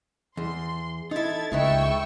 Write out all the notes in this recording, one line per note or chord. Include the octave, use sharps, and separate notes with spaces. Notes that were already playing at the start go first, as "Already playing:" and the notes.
E2 C6
D#4 E4 A4 G#6 A6
C#2 G#3 D#4 B4 E5 G5 C#6 E6